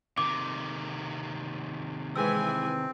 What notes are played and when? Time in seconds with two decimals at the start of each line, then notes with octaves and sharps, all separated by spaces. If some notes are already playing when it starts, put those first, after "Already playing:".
0.18 C3 D#3 D6
2.16 E3 G#3 C4 G#5 E6